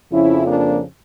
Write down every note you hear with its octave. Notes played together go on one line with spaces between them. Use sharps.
F2 C#3 F3 C#4 E4
A#3 D4